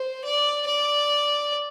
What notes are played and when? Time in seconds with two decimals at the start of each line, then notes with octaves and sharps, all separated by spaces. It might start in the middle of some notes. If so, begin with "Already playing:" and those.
Already playing: C5
0.24 D5
0.67 D5